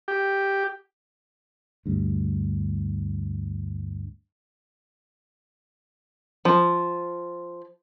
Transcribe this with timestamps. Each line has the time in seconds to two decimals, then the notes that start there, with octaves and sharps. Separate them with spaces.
0.08 G4
1.86 D2 G2
6.45 F3